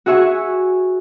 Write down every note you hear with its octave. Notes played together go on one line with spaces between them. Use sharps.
F#4 G#4 E5 G#5 C#6